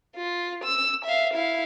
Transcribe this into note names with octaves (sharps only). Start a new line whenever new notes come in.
F4
E6
E5 F5
E4 F5